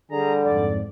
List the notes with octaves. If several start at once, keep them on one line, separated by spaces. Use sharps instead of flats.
D3 G3 G#4 A#5
F2 G#2 D5